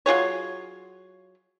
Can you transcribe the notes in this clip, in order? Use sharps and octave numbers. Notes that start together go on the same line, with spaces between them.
F#3 F4 G#4 C#5